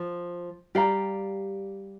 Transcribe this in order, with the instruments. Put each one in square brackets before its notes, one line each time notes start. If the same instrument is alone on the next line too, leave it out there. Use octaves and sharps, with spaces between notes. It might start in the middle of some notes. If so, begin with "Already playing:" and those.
Already playing: [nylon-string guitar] F3
[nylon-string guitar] G3 [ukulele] G4 D5 F5 A#5